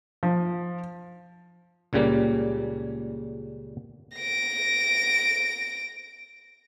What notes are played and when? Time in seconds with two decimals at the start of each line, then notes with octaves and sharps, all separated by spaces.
0.23 F3
1.93 C#2 A#2 C#3 G3 A#3
4.17 A#6 D7